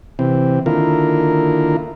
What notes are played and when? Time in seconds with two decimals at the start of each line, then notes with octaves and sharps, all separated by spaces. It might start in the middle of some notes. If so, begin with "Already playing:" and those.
0.19 C3 E3 C4
0.66 D3 D#3 A#3 E4 F4 A#4